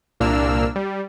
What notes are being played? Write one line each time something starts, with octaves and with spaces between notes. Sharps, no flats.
C2 A#2 A#3 D4 E6 F6
G3